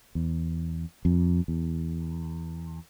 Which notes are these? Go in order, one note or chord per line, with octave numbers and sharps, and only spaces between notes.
E2
F2
E2